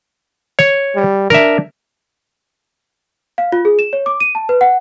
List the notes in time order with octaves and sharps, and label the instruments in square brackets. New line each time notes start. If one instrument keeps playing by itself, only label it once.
[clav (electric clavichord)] C#5
[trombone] G3
[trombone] D4 [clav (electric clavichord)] A#4 E5
[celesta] F5
F4
G#4
E7
C#5
D6
D#7
A5
B4
F#5